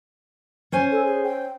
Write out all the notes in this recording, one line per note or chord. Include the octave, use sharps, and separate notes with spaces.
C#4 C5 G#5
A4
G#4
G5